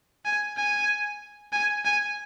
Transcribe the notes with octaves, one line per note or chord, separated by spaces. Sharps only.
G#5
G#5
G#5
G#5